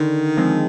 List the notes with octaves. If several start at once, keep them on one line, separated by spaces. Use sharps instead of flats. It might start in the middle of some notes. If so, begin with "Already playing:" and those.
Already playing: D3 D#3
F3 G#3 C4